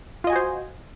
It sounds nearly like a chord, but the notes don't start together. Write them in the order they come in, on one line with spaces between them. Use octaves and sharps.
F4 D#5 G#5 F#4 C5